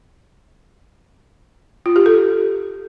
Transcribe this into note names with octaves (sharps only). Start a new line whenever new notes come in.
F4
G4
A4